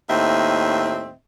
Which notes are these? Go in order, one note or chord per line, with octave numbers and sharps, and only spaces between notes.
D#2 A2 C4 D#5 E5